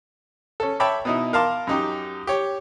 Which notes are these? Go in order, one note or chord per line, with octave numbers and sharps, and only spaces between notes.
C#4 A4
C#5 E5 G5 A5 B5 D6
B2 D#4 E4
A#4 F5 A5 C6 D6
F#2 D#4 G4
G4 C#5